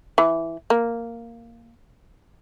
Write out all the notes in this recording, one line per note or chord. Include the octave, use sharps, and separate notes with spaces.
E3
A#3